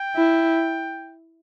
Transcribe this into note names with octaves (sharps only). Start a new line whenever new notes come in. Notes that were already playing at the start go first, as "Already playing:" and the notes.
Already playing: G5
E4